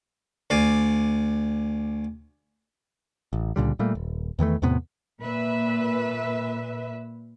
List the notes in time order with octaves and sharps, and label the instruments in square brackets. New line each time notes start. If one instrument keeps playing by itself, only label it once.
[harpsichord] D2 D5 F5 G#5
[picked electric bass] A1
C#2 A#2 D3 G3
A#2 G3 A3 A#3
D#1
E2 D#3 E3 A3
E2 A2 C3 B3
[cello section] A#2 B4 E5